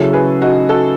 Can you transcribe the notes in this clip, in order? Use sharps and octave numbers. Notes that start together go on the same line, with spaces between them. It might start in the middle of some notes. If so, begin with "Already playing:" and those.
Already playing: C#3 F#3 C#4 E4 F#4 A4
G#4 B4
D#4 F#4
F#4 A4